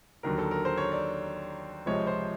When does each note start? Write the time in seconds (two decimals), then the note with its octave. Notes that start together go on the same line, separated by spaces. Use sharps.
0.23 D#2 D3 F#3 A#4
0.38 A4
0.51 A#4
0.65 C5
0.78 C#5
0.92 D5
1.86 C#2 C3 F3 G#3 C#5
2.07 C5